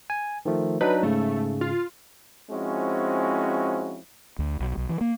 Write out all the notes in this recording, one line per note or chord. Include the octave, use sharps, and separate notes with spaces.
G#5
D#3 F3 A3
F#3 D4 D#4 B4
G#2 C#3 A3
F4
F3 G#3 C4 C#4 E4 F#4
D2
B1
B1
E3
A#3